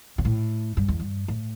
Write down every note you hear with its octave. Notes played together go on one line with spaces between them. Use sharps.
C3
A2
G2
E2
G2
A2